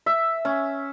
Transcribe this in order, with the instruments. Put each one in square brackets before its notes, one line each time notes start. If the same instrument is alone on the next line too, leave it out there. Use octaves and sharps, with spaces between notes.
[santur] E5
C#4